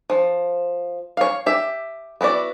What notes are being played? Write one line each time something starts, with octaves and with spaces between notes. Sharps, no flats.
F3
C#5 F5
G4 E5
B3 E4 F#4 D5